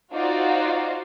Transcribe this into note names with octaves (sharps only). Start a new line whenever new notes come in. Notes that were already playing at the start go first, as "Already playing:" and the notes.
D#4 F4 F#4 C5 D5